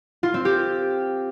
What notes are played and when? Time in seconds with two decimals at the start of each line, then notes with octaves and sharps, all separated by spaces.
0.23 F4
0.34 C4
0.45 G4